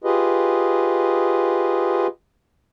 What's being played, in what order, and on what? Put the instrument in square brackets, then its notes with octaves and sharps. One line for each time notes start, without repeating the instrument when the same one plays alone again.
[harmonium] F4 G4 G#4 B4 D#5